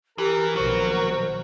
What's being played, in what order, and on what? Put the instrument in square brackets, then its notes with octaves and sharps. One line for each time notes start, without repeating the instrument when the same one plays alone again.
[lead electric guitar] E3 [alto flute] G4 [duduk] A#4
[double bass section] A#1 B2 D#3 [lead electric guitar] F#3 [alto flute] C5